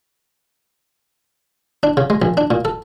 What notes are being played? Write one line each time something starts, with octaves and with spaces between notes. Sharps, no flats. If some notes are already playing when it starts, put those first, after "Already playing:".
D4
C#3
G#3
A#1
D4
A#2
A4